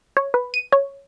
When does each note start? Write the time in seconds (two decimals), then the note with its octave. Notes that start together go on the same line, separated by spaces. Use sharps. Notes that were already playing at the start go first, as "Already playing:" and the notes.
0.17 C#5
0.34 B4
0.54 D#7
0.72 C#5